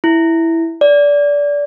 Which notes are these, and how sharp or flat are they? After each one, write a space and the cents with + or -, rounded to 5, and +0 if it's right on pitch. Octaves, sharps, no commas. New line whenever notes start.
E4 +0
D5 -20